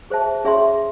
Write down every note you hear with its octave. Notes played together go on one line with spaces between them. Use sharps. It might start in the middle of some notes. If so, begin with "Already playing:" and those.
G#4 C5 E5 A5
C#4 G#4 C#5 E5 C6